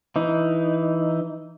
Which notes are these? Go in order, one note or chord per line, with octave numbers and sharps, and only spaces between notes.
E3 D#4